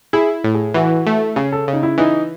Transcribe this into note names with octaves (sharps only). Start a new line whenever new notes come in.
E4 G#4
A2
G#4
E3 F#4
A3
C#3 G#4
A4
C#3
D#4
E4
E3 D#4